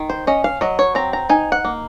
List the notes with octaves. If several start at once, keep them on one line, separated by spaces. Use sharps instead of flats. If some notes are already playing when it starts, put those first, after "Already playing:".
Already playing: D#3
C5
C#4 D#5
F5
F#3 D#5
C#5
C4 A#5
A#5
D#4 G#5
F#5
A#3